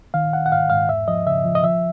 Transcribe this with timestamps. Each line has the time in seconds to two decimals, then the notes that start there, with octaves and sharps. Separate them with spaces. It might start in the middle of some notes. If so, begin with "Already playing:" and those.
0.14 D#3 F5
0.32 D#3 F#5
0.46 F#5
0.51 G#2 F5
0.70 G#2 F5
0.89 E2 E5
1.08 F3 D#5
1.27 C#3 E5
1.45 F3
1.55 D#5
1.64 F3 E5